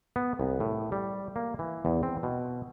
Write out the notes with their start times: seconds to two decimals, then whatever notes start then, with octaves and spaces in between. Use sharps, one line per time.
0.16 B3
0.40 C2
0.60 A2
0.92 G3
1.36 A#3
1.59 E3
1.85 E2
2.03 C4
2.23 B2